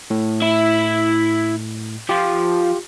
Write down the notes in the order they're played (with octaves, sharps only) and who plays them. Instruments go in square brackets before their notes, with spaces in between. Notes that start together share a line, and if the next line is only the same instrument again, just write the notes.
[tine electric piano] A2
[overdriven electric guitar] E4 E5
[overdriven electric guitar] F3 [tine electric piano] F4 G4